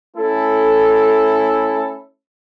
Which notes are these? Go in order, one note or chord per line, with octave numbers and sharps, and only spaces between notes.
A3 C#4 E4 A4